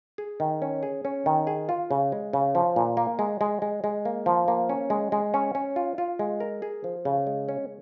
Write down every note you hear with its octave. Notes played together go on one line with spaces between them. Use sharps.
G#4
D#3
C#4
G#4
C#4
D#3
G#4
F4
C#3
G#3
C#3
F3
A#2
A#3
G#3
G#3
G#3
G#3
A#3
F3
A#3
C#4
G#3
G#3
C#4
C#4
F4
F4
G#3
A#4
G#4
F3
C#3
G#3
C#4